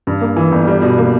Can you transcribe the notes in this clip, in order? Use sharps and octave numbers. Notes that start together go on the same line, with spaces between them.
G2
A#3
E3
G1
G3
B2
A#3